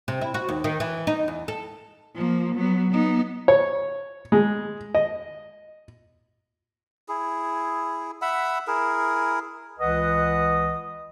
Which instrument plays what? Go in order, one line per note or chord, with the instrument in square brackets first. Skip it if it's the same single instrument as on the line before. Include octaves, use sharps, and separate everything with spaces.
[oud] C3
E4
F#4
D#2
D#3
E3
D#4
E2
A4
[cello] F3 A#3
F#3 B3
B3 D#4
[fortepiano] C#5
G#3
D#5
[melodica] E4 G#4
E5 F#5 B5 E6
E4 G#4 A#4
[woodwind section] C#2 E3 B4 D#5 F#5 D#6